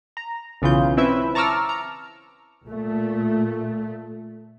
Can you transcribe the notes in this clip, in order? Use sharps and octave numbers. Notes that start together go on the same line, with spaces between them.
A#5
B1 C#3 E3 F4 G6
C4 C#4 E4 B4 E5
A5 A#5 C#6 D6 E6 F6
A#5
A#2 A3